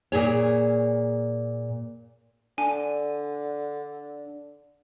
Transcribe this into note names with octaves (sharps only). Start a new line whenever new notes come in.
A#2 G#4 C#5
D3 D4 G#5